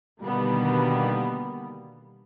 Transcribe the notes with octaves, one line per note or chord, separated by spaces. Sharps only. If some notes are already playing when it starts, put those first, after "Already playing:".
B2 D3 D#3 G3 A#3 B3